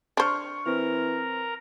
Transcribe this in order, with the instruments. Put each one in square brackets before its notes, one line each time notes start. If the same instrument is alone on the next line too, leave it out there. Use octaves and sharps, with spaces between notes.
[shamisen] D4 C5 [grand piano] C6 C#6 F6
[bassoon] E3 [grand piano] C4 [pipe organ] A#4 A#5